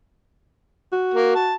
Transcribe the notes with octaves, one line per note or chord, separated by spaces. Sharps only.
F#4
A#3
A5